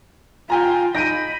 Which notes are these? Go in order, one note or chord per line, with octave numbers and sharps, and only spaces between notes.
F4 G5 G#5 A#5
D#4 B5 G6 A#6 D7 D#7